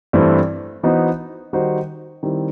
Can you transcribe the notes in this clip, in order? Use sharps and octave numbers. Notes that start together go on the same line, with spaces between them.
G2 E3 A3 C4 E4
E3 B3 D#4 F#4 C5
D#3 G3 D#4 F#4 C5
D#3 G3 C4 E4